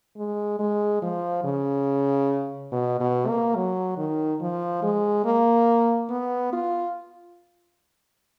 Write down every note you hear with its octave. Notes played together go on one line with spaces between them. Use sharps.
G#3
G#3
F3
C#3
B2
B2
A#3
F#3
D#3
F3
G#3
A#3
B3
F4